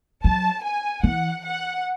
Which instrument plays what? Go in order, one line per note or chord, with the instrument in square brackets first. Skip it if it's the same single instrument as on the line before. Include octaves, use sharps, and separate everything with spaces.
[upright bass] F#3 [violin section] A5
[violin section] G#5
[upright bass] E3 [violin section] F#5
[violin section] F#5